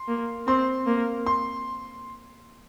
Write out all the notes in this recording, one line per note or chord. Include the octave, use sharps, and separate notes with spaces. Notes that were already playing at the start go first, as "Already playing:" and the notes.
Already playing: C6
A#3
C4 C6
A#3
C6